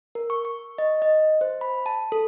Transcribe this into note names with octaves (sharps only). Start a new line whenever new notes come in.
A#4
C#6
C#6
D#5
D#5
C5
B5
A5
A4